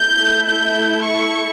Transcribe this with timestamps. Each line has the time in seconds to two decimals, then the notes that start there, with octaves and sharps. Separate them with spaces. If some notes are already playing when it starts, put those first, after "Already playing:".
Already playing: A3 E4 A4 G6
0.48 G6
1.05 C#6